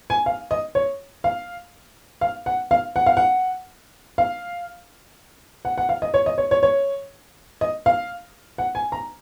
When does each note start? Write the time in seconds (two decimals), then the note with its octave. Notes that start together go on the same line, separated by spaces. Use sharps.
0.10 G#5
0.26 F5
0.51 D#5
0.75 C#5
1.24 F5
2.21 F5
2.46 F#5
2.71 F5
2.96 F#5
3.06 F5
3.17 F#5
4.18 F5
5.65 F#5
5.78 F#5
5.89 F5
6.02 D#5
6.14 C#5
6.26 D#5
6.38 C#5
6.51 C#5
6.63 C#5
7.61 D#5
7.86 F5
8.58 F#5
8.75 G#5
8.92 A#5